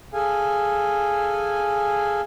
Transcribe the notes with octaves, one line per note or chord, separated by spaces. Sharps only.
G#4 A4 F5 G#5